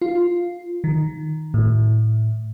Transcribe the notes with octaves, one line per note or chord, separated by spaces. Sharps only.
F4
D#3
A2